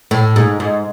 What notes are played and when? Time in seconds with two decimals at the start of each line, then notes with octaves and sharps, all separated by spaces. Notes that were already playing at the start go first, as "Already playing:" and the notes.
0.11 A2
0.36 G#2
0.60 G#2